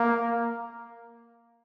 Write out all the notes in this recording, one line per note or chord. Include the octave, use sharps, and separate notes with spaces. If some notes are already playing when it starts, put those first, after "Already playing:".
Already playing: A#3